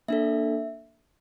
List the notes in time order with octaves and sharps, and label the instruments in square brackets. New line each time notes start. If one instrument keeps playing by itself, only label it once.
[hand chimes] A#3 D4 A4 E5